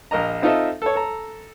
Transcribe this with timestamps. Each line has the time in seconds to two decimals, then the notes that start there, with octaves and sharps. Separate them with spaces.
0.11 A#1 A#4 D#5 A#5
0.42 C4 D#4 F4 A4 D#5 E5
0.82 A4 C#5
0.95 A4 A#5